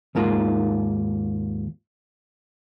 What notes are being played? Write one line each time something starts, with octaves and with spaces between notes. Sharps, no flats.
D#2 G#2 A#3 F4